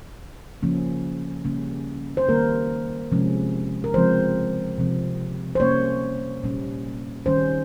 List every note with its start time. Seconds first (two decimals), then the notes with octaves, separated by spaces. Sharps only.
0.63 C#3 F3 A#3 C#4
1.45 C#3 G3 A#3 C#4
2.17 C5
2.29 D#3 G3 A#3 A#4
3.12 C3 F3 G#3 C#4
3.84 A#4
3.94 C#3 F3 G#3 C4 C5
4.78 C3 F3 C4
5.55 C5
5.60 C3 G3 A#3 C#4 C#5
6.43 A#2 G3 C#4
7.26 D#3 G3 C#4 C5